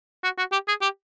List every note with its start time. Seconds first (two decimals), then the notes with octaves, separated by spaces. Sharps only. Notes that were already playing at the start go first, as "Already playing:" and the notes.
0.24 F#4
0.38 F#4
0.52 G4
0.68 G#4
0.82 G4